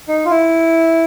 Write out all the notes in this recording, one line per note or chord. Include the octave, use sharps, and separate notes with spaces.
D#4
F4
E4